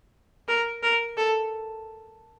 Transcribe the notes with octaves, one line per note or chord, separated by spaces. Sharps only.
A#4
A#4
A4